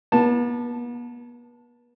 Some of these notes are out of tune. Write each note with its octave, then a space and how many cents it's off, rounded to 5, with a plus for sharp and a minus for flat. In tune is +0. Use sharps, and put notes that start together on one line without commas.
B3 -40 A5 +0